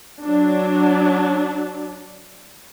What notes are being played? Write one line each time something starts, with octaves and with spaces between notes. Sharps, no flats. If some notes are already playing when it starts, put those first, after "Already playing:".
F#3 D4